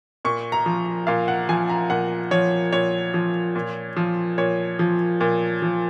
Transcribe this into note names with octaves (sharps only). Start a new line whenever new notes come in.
A#2 C#6
A#5
F3
A#2 F5
F#5
F3 G#5
A#5
A#2 F#5
F3 C#5
A#2 C#5
F3
A#2
F3
A#2 C#5
F3
A#2
F3